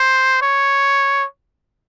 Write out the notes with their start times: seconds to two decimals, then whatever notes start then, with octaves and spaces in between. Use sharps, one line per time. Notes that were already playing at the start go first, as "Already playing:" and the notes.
Already playing: C5
0.42 C#5